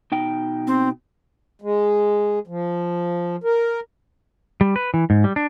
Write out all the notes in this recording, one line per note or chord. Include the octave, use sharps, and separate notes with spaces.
B2 D#4 G5
C4
G#3
F3
A#4
G3
B4
E3
G#2
G3
D4